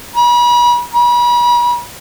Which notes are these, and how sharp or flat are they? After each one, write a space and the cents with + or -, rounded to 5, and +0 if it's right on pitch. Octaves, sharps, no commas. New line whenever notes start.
B5 -40
B5 -40